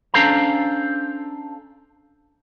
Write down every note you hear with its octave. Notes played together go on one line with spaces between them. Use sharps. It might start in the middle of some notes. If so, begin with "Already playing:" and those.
C#4 D4 A4 C5 F5 A#5